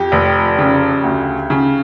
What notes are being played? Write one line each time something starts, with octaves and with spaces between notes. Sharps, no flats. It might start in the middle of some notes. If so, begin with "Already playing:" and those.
Already playing: F2 G4
F1
C#3
D2
C#3